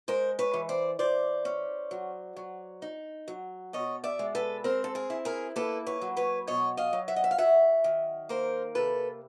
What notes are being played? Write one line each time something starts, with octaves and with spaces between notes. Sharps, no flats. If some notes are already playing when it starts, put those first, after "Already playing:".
G#3 A#4 C5
B4 C#5
E3
C5 D5
E3 C5 D5
C#4
F#3
F#3
D#4
F#3
B2 C#5 D#5
D5 E5
G#3
A4 B4
C4 A#4 C5
A4
G#4 A#4
E4
G#4 A#4
A#3 A4 B4
B4 C#5
F#3
B4 C#5
B2 C#5 D#5
D#5 F5
F#3
E5 F#5
D#5
E5
F5
F#3 E5 F#5
D#3
A#3 A#4 C5
C3 A4 B4